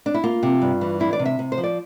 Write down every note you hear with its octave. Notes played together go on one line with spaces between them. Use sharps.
D4
E4
A#3 F4
C3
G2
E3
D4 E4
D5
C3
E5
C3
C5
F3
D5